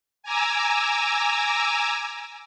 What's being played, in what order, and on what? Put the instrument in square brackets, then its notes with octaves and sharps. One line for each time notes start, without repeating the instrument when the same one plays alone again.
[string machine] G#5 A#5 D6 E6